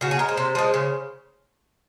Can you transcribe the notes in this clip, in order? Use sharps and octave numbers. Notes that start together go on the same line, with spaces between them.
C#3 F#4
G#4
G#3 A#4
C5
C3
F3 G#3
C#3